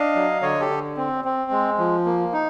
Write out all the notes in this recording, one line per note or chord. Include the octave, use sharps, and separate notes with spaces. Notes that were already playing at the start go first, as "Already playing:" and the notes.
Already playing: D4 D#5 F5
F#3
D3 C#5 D#5
G4 A4
D3
C4
C4
G#3
F3
A#3
D#4